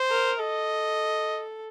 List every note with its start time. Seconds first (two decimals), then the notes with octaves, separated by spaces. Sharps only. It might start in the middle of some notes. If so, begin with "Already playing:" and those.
Already playing: C5
0.10 A#4
0.39 A4 D#5